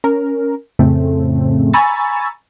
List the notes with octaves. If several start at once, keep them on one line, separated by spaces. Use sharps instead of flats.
C#4 A#4
F2 A2 C#3 A3 C4
G#5 A#5 B5 C#6 E6 A6